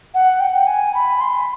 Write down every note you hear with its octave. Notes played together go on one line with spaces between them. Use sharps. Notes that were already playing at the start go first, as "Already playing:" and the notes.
F#5
G5
G#5
B5
C6